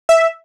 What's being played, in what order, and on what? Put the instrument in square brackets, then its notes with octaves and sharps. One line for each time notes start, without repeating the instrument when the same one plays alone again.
[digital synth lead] E5